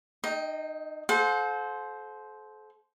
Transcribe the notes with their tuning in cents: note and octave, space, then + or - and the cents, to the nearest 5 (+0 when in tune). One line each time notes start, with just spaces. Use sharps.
D#4 -30 D#5 +20 G5 +0
A4 -40 C5 +0 F#5 -45